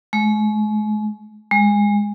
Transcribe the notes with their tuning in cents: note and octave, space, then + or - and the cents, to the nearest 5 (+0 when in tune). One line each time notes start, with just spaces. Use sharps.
G#3 +40
G#3 -15